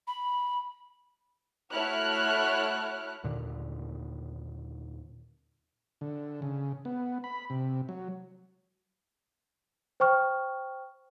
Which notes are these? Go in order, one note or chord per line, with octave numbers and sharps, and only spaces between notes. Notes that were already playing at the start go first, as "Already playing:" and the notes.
B5
A3 E4 F#4 C#5 F6 F#6
D#2 A#2 D3
D3
C#3
B3
B5
C3
F#3
C5 G5 C#6 F6